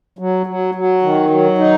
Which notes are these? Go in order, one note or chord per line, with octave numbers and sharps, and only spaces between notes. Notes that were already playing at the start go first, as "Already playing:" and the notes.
F#3
F#3
F#3
D#3
F#3
D#4